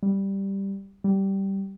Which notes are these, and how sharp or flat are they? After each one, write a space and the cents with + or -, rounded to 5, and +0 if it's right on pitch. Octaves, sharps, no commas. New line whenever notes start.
G3 +0
G3 -10